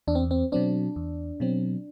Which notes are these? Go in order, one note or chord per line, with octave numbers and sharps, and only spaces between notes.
E2 D4
C4
C4
B2 F#3 C4 D4
E2
B2 F#3 C4